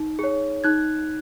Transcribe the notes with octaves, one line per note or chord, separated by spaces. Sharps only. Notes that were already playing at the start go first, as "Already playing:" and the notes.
Already playing: D#4
G#4 C#5
D#4 F#6 G#6